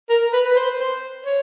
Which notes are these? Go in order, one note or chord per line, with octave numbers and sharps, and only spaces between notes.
A#4
B4
B4
C5
C5
C#5